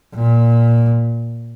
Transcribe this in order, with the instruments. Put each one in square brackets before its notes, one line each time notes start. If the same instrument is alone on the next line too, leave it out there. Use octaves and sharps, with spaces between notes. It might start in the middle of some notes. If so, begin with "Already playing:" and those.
[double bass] A#2